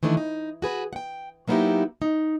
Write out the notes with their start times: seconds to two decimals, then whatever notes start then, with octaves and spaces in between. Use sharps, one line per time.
0.03 D#3 E3 A3 D4
0.17 D#4
0.62 F#4 G#4 B4
0.93 F#5 G5
1.47 F#3 A#3 B3 D#4 E4 G4
2.02 D#4